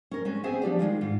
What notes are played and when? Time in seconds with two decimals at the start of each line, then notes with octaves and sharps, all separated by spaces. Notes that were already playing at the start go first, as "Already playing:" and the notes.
0.11 C#4 A#4
0.25 G#3 C4 C#4
0.43 B3 C4 G#4 C5 E5 G#5
0.62 F3 D4 G4 D5
0.79 D#3 F#3 G#3 F4
1.01 G#2 F4